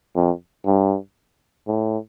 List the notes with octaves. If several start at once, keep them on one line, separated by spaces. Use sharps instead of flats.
F2
G2
A2